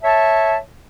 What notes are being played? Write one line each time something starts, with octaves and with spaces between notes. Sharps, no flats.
C#5 E5 A5